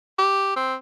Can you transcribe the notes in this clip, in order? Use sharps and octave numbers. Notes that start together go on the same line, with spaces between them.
G4
C4